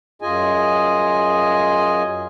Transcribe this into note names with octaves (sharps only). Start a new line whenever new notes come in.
F#2 F4 G#4 D#5 G#5